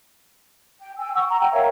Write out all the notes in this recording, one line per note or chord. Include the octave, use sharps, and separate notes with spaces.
G5
G5 G#5 E6
F#5 C#6 E6
A#5
F#5 G5
A#4 C#5 E5 F5